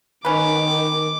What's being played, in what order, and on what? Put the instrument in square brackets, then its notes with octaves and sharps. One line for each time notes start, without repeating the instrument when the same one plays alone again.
[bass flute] D#3 [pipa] C#4 B4 [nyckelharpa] D6